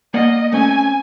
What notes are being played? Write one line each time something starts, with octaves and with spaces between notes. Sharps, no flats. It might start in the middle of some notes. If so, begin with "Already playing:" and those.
A#3 D5 D#5 F#5
A3 C4 C#4 G#5